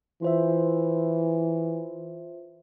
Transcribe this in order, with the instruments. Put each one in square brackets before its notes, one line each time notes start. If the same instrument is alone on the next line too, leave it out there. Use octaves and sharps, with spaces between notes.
[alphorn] E3 [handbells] F4 C5 E5